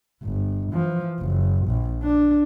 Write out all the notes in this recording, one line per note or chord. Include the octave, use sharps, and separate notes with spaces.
G1
E3 F3
F#1
A#1
D4